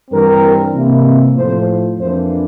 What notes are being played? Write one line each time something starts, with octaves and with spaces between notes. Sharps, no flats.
G2 E3 G3 C4 A#4
C3 E3 A#3 E4
A2 F3 A3 C5
F2 E3 A#3 D4 C5